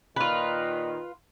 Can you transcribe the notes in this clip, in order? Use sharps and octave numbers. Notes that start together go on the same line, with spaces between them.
A#2 D#3 F4 B4